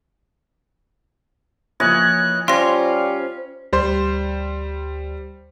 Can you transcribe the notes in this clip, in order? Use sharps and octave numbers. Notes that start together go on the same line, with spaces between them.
E3 F3 A#3 E4 C#5 D#5 F#6
G3 C#4 F4 C5 C6 A#6
D2 G3 C5 C6